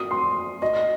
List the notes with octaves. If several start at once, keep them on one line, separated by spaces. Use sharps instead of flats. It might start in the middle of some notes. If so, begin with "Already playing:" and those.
Already playing: F#4 D#6
C6
F#4 D#5